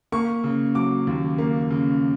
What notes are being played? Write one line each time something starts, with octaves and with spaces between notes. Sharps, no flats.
A#3 C#6
C#3
F#3 D6
D#2
A#3
C#3